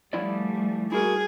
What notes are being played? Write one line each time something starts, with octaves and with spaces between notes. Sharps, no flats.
F3 G3 A3 E4 D5
E4 F#4 G#4 A#4